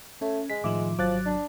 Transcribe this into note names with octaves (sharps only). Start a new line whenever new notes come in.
A3 C#4
G#3 B6
A2 D#3 F3 E5 D6
G#1 F3 F#3 D6 F#6 A6
D4